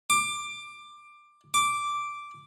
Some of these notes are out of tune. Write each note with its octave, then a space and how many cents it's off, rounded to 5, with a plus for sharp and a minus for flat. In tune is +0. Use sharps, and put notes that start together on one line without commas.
D6 +15
D6 -5